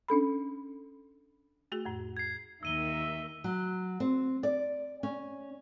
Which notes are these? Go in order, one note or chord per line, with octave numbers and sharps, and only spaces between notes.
C#4 D4 A4 B5
A3 F#4 G#4
F2 A2
G#6 C7
D#2 D#3 A#4 E5 E6 D#7 G7
F#3
C4
D5
C#4